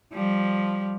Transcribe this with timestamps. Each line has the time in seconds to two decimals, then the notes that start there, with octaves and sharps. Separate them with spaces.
0.13 F3 G3